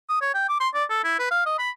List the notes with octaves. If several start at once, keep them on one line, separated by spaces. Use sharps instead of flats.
D#6
C#5
G5
D6
C6
D5
A4
E4
B4
F5
D#5
B5